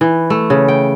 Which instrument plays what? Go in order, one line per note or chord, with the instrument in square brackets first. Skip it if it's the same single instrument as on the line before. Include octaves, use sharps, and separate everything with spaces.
[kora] E3
A3
C#3
G5